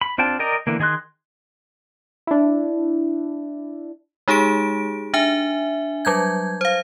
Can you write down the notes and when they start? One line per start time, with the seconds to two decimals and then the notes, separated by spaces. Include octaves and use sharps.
0.01 B5
0.18 C4 D4 F4 G5 A5
0.39 A#4 D5 D#5 G5 A#5
0.67 D3 E3 A#3
0.80 D#3 G#4 D#5 C6 F#6
2.27 D4 E4
4.28 G#3 D#4 G4 G#4 D7
5.14 D4 E5 G#5
6.05 F#3 G3 G6 G#6
6.61 C5 F5